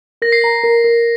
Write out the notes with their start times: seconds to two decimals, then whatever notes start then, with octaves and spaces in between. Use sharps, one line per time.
0.22 A#4 A#6
0.32 C7
0.42 A#5 A#6
0.63 A#4
0.84 A#4